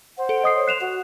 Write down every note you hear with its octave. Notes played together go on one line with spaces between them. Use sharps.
C5 F#5
A4 D7
D#5 D#6 C7
C#5
F#6 C7 E7 F7
F#4 F#5